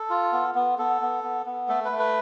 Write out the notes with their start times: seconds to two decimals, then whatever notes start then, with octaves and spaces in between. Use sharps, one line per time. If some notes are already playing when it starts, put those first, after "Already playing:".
Already playing: A4
0.10 F4
0.33 B3
0.55 B3
0.79 B3 A4
1.01 B3
1.24 B3
1.46 B3
1.69 A3 A4
1.85 B4
1.92 A3
1.99 B4